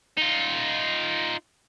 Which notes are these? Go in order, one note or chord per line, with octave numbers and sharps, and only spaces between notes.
D#4 F4